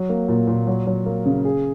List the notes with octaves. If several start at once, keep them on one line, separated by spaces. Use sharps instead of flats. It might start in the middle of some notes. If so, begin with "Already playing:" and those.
Already playing: F#3
A#3
A#2
A#2
F#3
F#3
A#3
C#3
G#4